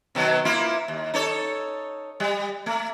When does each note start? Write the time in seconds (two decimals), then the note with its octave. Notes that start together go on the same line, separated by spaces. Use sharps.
0.15 B2 D#3 F#3
0.45 A#3 E4 F4
0.88 D#2
1.14 D#4 A4 C#5
2.20 G3
2.66 A3